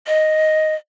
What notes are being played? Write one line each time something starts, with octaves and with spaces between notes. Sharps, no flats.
D#5